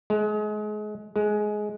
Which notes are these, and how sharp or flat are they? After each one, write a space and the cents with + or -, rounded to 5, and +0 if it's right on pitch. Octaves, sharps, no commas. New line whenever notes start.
G#3 +30
G#3 +15